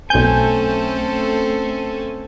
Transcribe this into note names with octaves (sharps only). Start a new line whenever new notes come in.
B1 A3 C4 C#4 A4 G#5 G6